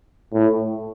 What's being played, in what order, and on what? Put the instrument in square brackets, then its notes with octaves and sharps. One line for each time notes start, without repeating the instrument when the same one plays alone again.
[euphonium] A2